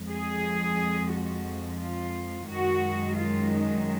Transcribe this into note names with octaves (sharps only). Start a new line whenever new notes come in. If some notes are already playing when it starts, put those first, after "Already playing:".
Already playing: F2 F3 G#3
G#4
F#4
F4
F#2 D#3 G#3 F#4
F4
D#4